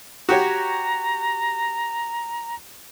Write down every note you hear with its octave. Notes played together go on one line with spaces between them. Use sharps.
F#4 G4 C#5 A#5